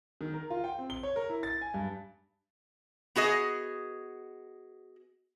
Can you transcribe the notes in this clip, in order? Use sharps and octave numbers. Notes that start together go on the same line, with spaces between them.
D#3
A#4
F4
G5
C4
G7
C#5
A#4
E4
A6
G#5
G2
B3 F#4 G#4 D#5